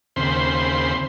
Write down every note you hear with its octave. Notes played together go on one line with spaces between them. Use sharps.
D#2 C#3 C4 C5 B5 C6